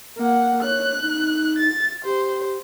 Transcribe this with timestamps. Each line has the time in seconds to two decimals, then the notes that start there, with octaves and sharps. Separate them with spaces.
0.18 A#3 F#5
0.62 C#5 F#6
1.02 D#4
1.58 A6
2.04 G4 C5